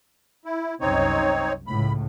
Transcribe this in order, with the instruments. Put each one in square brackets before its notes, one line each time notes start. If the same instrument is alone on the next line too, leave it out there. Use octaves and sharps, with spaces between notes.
[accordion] E4
[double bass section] C2 F#2 [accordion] C4 D#4 C#5
[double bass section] C#2 A2 [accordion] B5